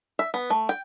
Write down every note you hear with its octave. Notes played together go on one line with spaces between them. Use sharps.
E5
B3
A3
G5